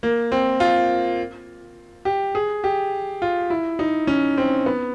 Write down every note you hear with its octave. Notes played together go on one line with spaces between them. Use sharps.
A#3
C4
F4
G4
G#4
G4
F4
E4
D#4
C#4
C4
B3